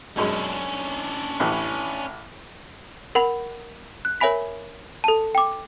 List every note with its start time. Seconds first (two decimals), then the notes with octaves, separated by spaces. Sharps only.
0.17 B1 F#2 G#3 C#4 D4
1.40 A1 E3
3.15 A#4 F#5 B5 F7
4.05 F#6
4.21 A#4 C#5 E5 G#5 B5 B6
5.04 A4 A5
5.35 G5 D6